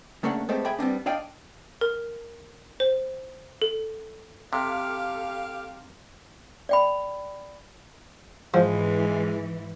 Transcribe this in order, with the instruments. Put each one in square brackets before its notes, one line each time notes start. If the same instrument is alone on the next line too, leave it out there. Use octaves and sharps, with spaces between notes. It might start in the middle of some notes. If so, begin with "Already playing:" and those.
[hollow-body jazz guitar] C#3 A3 A#3 C#4 D4 F#5
G#3 A3 B3 C4 G4 A4
G#4 E5 G5 B5
G3 B3 C4 D4
D4 D5 D#5 F5 G5
[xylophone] A#4
C5
A4
[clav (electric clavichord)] C3 [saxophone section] G4 F5 [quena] A4
[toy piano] D5 G5 B5
[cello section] G#2 E3 [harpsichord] F3 [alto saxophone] G#3